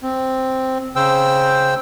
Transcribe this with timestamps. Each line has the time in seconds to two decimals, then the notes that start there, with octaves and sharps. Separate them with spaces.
0.03 C4
0.96 C#3 C5 G5 E6